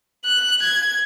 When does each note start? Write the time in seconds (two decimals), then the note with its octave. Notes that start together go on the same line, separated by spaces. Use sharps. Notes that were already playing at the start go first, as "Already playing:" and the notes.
0.25 F#6
0.62 G#6